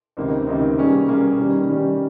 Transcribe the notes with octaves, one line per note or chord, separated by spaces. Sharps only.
C#2 C3 D#3 A#3
C#2 C3 D#3 A#3
G3 A#3 C#4 G#4
G3 A#3 C#4 G#4
D#3 G3 C#4
D#3 G3 C#4